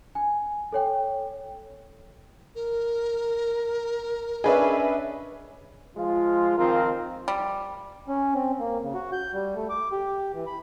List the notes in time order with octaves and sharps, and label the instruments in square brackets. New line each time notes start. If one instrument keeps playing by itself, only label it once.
[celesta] G#5
A4 C#5 G5
[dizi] A#4
[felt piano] C#4 D4 D#5 [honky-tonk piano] G#4 B4 E5
[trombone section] F3 G#3 F4
D#3 F3 C4 F4 A#4
[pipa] G3
[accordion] C#4
C4
A#3
C#3
F#4
G6
G3
A3
D6
G4
E3
B5